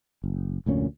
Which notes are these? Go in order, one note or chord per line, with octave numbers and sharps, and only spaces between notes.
F#1
F1 D2 A#2 C#4